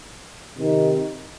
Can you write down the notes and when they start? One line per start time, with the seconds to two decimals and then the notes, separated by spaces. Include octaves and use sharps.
0.56 C3 D#3